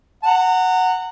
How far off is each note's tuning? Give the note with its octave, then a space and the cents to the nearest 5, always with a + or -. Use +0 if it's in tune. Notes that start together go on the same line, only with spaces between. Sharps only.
F#5 +0 A#5 -30